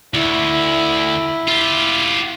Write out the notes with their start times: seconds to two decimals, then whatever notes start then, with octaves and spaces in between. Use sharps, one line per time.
0.14 D2 E4
1.48 F4 G4